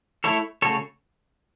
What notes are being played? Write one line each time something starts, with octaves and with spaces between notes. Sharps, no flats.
A3 E4 A4 C#5
C#3 A3 F#4 A4 C#5